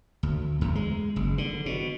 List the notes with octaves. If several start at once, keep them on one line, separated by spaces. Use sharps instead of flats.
D2
E2
G#3
F#1
D3
B2